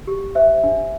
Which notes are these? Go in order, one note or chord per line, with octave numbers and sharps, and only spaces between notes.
G4
C5 E5
D4